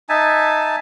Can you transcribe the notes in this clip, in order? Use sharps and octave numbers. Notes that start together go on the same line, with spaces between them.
D#4 E5 G#5 A5